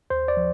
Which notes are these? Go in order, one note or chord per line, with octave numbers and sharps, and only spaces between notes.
D#2 C5
D5
F3